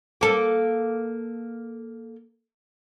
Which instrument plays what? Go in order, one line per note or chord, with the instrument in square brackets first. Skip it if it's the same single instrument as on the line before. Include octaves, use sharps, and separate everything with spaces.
[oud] A#3 A4